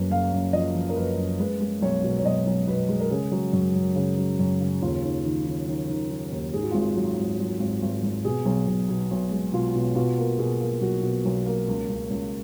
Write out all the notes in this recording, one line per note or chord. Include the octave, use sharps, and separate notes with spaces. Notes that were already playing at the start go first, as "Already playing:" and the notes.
Already playing: F#1 F#2 B4
F#1 F5
F#1
F3 D#5
F3
A#4
F#1 B4
F#1
G#3 B4
G#3
B1 C#5
B2
C#5
B1 D#5
B1
B2 B4
G#3
A#4
C#3 G#4
F#3
F#2
F#2
C#3
F#3
F#2
C#3
D#2 F4
D#3
D#3
D#3
D#3
D#3
D#3
D#2
G#2 G#4
F#4
G#1 F4
F#4
F#3
G#1
F#3
G#1
G#1
G#1
B2 G#4
B1
B1
B2
B1
G#3
B2 F4
B2
B2 F4
A#3
B2 G#4
A#3
B1 F#4
B2
B1
A#3
C#2
C#2
C#2